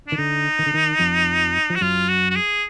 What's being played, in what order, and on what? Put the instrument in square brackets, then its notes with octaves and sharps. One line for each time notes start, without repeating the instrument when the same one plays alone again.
[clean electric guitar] D#3 [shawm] D4
[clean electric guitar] D3 [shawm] D#4
[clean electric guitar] D#3
D3
D#3
F2 F3
F3
[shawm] F#4
[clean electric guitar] F#2 F#3 [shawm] F4
[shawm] F#4
F#4
G#4